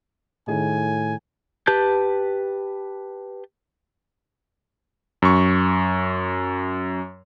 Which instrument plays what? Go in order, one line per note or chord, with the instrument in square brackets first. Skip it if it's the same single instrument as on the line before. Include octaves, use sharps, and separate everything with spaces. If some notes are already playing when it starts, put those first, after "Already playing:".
[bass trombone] A2 [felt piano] D#3 G#4 [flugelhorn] G#5
[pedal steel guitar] G4 B4 A5 G6
[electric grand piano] F#2 C#6